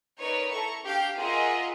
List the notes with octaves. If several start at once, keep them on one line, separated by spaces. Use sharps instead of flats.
D#4 A#4 B4 C#5 D5
E4 A4 A#5 C#6
D4 G4 F5 G6
F4 G#4 A#4 D#5 E5 F#5